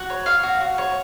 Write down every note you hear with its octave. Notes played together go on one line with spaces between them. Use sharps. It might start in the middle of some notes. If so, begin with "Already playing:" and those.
Already playing: F#4
C#5
F5
F#4
F#4
C#5